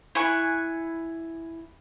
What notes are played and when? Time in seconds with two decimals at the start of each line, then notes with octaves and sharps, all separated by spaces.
0.15 E4 G#5 C#6 F#6